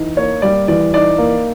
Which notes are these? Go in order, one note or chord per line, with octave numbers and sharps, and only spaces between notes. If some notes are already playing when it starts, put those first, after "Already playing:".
Already playing: E3 D#4
A#3 C#5
G3 D5
E3 D5
D#4 D5
A#3